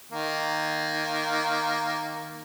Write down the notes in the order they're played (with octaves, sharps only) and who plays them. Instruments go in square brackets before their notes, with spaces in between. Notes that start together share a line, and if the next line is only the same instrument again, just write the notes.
[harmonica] D#3 A#3